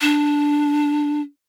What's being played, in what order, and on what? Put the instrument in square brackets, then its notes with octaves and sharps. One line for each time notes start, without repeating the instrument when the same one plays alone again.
[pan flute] D4